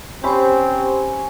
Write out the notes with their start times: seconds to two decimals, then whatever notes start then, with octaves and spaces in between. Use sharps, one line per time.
0.24 C4 C#4 G4 C5 B5 E6